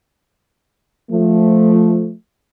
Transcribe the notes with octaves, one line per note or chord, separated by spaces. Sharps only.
F3 A3